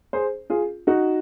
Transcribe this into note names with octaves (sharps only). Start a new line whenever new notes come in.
G#4 C5
F4 G#4
D#4 F#4